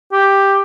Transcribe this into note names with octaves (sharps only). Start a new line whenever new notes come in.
G4